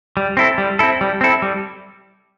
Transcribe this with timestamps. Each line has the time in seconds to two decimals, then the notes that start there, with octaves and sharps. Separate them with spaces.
0.17 G3
0.37 C4 E4 A4
0.58 G3
0.79 C4 E4 A4
1.01 G3
1.21 C4 E4 A4
1.42 G3